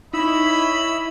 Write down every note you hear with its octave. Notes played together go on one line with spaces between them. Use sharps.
D#4 E4 C#5 D#5 B5 E6